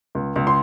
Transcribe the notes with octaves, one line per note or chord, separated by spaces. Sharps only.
C#2
C#2
C6